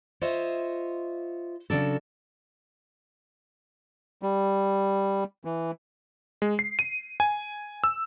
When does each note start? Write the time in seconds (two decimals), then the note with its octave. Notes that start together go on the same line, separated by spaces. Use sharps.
0.21 F4 C5 C#5 D#5 E5
1.70 C#3 F#3 D4 A4
4.23 G3
5.45 E3
6.42 G#3
6.59 C7
6.79 D#7
7.20 G#5
7.84 E6